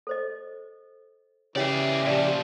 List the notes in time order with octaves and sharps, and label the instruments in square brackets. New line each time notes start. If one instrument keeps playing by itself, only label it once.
[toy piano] A4 C5 D#5
[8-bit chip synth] C#3 G4 [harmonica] E3 [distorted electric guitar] G#4 D5 [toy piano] C#5 G5
[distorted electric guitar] A#2 F3 [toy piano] D5